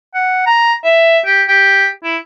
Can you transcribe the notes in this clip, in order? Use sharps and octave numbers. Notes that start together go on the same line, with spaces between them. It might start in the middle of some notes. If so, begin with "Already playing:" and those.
F#5
A#5
E5
G4
G4
E4